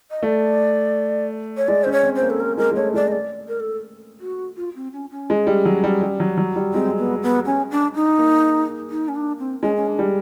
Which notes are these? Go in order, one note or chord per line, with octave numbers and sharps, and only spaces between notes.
D#5
A3 D5
C#5
G#3 D5
C#4 C5
C#5
C4
C5
A#3
A4
A#4
G#3 A#4
G#3
A3 C#5
G#3 D5
D#5
D5
A#4
A4
F#4
F4
C4
C#4
C#4
G#3
G3
F#3
G3
G3
F#3
F#3
G3
G#3 C4
B3
B3
C#4
D4
D#4
A#3
D#4
C#4
D4
C4
G#3 C#4
C#4
D4
G3